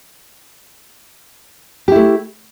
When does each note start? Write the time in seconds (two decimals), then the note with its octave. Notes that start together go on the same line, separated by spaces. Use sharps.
1.88 G4
1.92 E4
1.95 A3